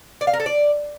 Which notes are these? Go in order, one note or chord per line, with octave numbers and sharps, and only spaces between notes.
D5
F5
A#4
A4
D5